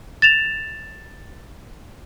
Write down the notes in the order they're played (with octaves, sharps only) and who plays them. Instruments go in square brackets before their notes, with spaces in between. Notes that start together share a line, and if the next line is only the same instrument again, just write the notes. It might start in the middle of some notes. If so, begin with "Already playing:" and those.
[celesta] A6 E7 F7